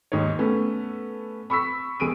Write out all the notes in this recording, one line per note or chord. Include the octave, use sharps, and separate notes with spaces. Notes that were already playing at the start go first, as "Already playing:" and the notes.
D#2 G#2 D#4 C#5
A3 B3 C#4
B5 C#6 E6 B6
E1 G#4 D7 D#7